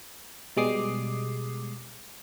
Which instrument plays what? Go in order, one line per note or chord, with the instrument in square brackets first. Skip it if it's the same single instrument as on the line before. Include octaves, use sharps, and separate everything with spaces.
[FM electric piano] B2 G3 G#3 D6 D#6 C7